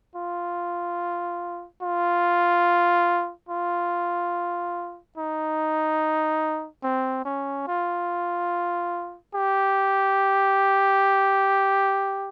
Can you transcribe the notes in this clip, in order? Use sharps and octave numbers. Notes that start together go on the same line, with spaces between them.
F4
F4
F4
D#4
C4
C#4
F4
G4